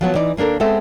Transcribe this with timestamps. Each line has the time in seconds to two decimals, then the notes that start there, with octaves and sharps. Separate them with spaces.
0.01 F3 F#3 B3
0.15 E3 D#4 D5
0.37 D#2 A#3 D4 A4 A#4
0.60 G#3 B3 C4 A4 E5